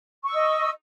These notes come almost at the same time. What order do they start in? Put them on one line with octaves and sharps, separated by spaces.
C#6 E6 D#5